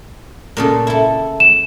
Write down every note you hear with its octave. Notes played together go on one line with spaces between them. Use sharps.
A#2 C#3 A4
E4 A4
E7